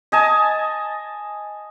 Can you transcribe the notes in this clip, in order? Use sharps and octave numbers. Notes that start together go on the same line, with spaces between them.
D#5 G#5 A5